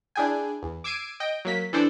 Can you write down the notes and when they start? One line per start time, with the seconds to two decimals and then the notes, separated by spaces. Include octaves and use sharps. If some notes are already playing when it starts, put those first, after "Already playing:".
0.15 D4 E4 G#4 G5 G#5
0.63 E2
0.84 D6 E6 G#6 C7 D7 D#7
1.20 D#5 G5
1.45 F#3 A#3 B6
1.73 E3 D4 A4 C5 D5